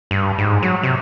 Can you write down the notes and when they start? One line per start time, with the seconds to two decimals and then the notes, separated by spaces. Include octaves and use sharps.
0.11 G2
0.38 G#2
0.62 F#3
0.83 C3